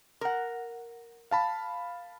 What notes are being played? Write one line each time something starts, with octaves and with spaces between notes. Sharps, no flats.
A#4 F#5
F5 A5 B5